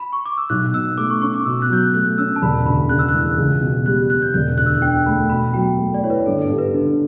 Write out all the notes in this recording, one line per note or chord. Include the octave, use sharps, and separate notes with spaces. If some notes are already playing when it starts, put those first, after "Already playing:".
B5
C#6
D6
E6
B1 F#6
B2 E6
A3 D6
C#6
C#4 C#6
D6
B2 E6
F#6
F#3 G6
F#6
A3 F#6
C#4 E6
A5
E1 B5
D2 B5
C#3 F#6
E6
F#6
E3
C#2
B2
G3 F#6
B3 F#6
G6
E1 G6
D2 F#6
E6
F#6
D3 G5
A3 B5
B2 B5
F#3 G5
A3
D5
E4 C#5
B4
G1 A4
A4
G2
B4
D3 A4